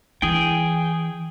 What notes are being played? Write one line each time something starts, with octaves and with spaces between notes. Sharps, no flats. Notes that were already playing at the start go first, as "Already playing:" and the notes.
E3 G#4 G5